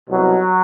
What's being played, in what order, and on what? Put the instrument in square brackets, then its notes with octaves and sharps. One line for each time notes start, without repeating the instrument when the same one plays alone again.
[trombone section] C2 B2 F#3